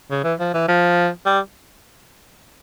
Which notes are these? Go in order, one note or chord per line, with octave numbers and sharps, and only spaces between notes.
C#3
E3
F3
E3
F3
G3